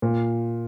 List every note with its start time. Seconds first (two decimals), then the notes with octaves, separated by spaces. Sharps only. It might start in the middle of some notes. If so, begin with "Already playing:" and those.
0.02 A#2